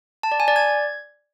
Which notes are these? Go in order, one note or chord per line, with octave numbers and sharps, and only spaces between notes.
A5
D5
G#5
D5
G#6